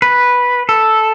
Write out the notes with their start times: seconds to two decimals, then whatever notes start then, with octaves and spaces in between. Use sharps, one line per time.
0.02 B4
0.69 A4